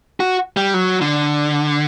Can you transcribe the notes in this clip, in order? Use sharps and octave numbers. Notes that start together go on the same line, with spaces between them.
F#4
G3
F#3
D3